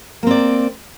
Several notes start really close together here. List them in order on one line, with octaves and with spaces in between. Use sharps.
A#3 C4 D5